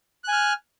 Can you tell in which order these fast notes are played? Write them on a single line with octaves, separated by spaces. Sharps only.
F#6 G#5 F6